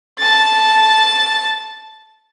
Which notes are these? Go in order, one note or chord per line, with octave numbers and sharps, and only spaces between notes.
A5 A6